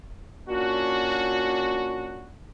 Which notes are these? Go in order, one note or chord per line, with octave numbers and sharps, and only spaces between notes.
A#2 C#4 D4 F#4